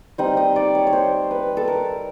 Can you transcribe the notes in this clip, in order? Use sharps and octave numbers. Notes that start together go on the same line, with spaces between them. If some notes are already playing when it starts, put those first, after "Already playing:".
G3 C4 D#4 D#5
D#5
D5
C#5
C#5
C5
B4
A4
A#4